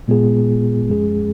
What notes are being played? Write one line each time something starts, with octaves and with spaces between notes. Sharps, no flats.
A#2 G#3 B3 F4 G#4
F#2 F3 G#3 C#4 G#4